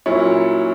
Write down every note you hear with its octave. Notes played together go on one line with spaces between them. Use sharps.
A#2 F#3 C#4 E4 C#5